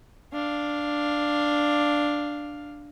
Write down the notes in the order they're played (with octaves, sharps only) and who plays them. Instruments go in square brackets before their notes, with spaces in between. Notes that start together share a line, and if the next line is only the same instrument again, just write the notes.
[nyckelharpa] D4 F5